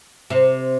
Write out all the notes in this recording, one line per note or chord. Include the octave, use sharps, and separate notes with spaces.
C3